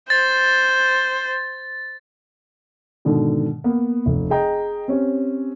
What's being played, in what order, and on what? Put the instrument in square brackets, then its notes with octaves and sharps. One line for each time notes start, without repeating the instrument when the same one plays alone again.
[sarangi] C5 [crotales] A6
[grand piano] G#2 B2 D3 D#3
A#3 B3
F1
G#4 D#5 G5 A#5
C4 C#4 G4